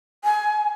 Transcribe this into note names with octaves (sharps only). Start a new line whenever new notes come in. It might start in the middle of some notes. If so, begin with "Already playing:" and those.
G#5